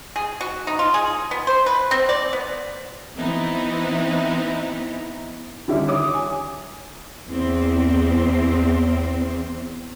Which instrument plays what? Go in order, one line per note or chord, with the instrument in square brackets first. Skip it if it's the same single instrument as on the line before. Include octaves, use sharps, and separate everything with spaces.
[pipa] G#4
F#4
D#4
F4
G#4
B3
C5
B4
C4
D5
B3
[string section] E3 B3 C4 D#4 E4
[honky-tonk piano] D3 D#3 G3 C#4 D4 E4
C#5 D6 D#6
G#5
[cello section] E2 C4